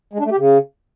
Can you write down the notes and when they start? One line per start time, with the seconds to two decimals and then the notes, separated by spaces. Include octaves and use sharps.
0.13 G#3
0.19 D4
0.25 A3
0.32 G4
0.38 C#3